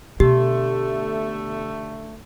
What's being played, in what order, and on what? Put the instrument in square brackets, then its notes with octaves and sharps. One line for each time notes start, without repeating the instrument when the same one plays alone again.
[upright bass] B2 [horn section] D3 A3 [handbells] G4